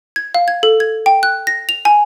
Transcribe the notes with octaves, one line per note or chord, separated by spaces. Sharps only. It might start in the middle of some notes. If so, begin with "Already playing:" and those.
G#6
F5
G#6
A4
G#6
G5
F#6
A#6
F7
G#5